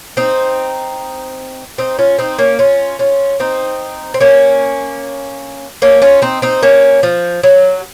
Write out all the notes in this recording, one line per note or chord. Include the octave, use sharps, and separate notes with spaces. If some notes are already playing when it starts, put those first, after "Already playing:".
C4 D#4
C4 D#4
C#4 F4
C4 D#4
A#3 C#4
C#4 F4
C#4 F4
C4 D#4
C4
A#3 C#4
A#3 C#4
C#4 F4
C4 D#4
C4 D#4
A#3 C#4
F3
F#3